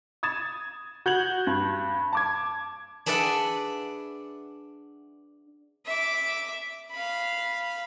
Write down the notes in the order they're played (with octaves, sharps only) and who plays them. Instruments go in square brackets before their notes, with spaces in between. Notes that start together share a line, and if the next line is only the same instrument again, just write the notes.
[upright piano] D#6 G#6 A6 E7
F#4 G6 G#6 F#7
G2
A5 D6 G#6
[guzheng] D4 G#4 B4 D5 E5 F#5
[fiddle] E5 D6
F5 B5